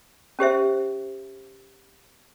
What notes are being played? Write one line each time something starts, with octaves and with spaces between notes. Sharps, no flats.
C#4 G4 C5 E5